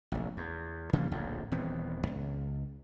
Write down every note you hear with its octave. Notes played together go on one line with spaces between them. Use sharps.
F1 A#1
E2
C#3 F3 G3 A#3
D1 A#1 F2
D#1 E3 B3 C4
C#2